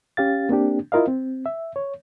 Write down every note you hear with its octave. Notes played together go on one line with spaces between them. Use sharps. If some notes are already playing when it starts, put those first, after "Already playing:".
C#4 G4 F5 A6
A#3 C4 D4 G4
E4 F4 A#4 D#5 F5
C4
E5
C#5